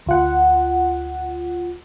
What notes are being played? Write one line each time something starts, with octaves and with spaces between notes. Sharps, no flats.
D2 F4 F#5